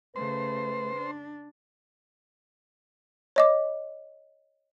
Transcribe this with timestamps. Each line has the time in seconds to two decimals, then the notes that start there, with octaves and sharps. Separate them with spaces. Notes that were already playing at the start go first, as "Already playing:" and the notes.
0.16 C#3 A3 B4 C5
0.96 D4
3.36 C#5 D#5 D6